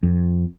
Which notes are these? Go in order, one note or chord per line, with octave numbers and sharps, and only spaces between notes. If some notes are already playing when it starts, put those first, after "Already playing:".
F2